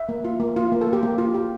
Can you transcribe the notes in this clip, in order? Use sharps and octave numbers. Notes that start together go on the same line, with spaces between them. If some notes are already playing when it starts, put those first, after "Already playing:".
Already playing: E5
A#3
F4
A#3
F4
A#3
A4
A#3
G4
A#3
F4
G4